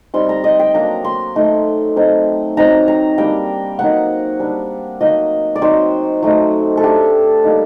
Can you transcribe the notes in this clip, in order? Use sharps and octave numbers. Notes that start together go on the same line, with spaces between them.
G3 C4 D#4 C6
A#5
D#5
G5
F#3 A#3 D4 A#5
C6
A3 D#4
F#3 C4 D#4
F#3 C4 D#4 A#5
A#5
G3 A#3 D4 G5
F#3 A#3 D#4 F#5
G3 D4
F#3 A#3 D#4 D#5
D5
F#3 C4 D#4 C5
F#3 A3 D#4
A4
A3 D4 G4
G3 A#3 D#4